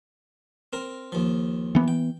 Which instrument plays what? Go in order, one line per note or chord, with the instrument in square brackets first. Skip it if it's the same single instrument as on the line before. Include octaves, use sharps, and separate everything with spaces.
[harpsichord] C4 A#4
D#2 F3
[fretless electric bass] E3 B3
[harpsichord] G5